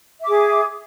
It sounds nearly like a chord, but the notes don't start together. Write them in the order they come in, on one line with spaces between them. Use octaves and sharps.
E5 D6 G#4